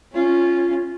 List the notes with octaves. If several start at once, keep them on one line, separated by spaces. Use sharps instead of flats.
C#4 F4